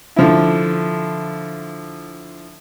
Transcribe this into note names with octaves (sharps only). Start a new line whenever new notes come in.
D3 F3 E4